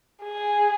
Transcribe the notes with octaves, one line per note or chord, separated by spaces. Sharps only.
G#4